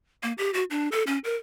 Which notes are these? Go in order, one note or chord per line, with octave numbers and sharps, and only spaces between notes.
A#3
G4
F#4
D4
A4
C#4
A#4